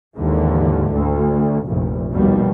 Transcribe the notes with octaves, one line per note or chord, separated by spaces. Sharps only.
D#2 G#2 D3 E3
D2
F1 A#1
A#1 D#2 B2 G3